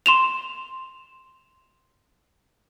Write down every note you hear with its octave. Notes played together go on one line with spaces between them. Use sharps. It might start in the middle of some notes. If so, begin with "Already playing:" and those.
C6 E7 F7